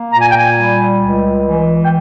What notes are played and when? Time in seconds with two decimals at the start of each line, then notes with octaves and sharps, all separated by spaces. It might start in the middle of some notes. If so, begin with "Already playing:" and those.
Already playing: A#3
0.13 A#2 A#5
0.22 G#5
0.30 G5
0.38 G#5
0.57 G3
1.01 C#2
1.45 E3
1.85 G5